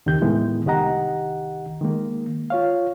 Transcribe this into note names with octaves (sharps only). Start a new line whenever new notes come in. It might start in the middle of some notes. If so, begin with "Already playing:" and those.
D#2 C3 D#3 G4 G6
A2 D#3 E3 G#3 B3 E4
C2 D#3 G4 D#5 F#5 A#5
D#3 G#3 A#3
F4 C#5 F5